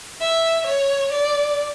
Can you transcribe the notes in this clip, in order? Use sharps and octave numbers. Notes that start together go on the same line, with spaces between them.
E5
C#5
D5